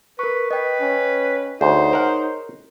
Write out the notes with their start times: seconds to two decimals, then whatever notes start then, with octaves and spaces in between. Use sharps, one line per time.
0.19 A#4 B4 C#6
0.51 B4 D#5 G5
0.81 C#4
1.61 D2 D#4 G#4 C5 C#5 C6
1.93 A#4 F#5